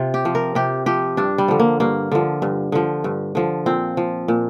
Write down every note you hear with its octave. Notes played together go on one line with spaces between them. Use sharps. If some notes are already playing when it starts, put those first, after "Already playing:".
Already playing: C3 F4
G4
F3
A#4
C3 G4
F3 G4
G2 D4
G3
D3 F3
A#3
G2 A#3
D3 F3
G2
D3 F3
G2
D3 F3
A#2 C4
F3
A#2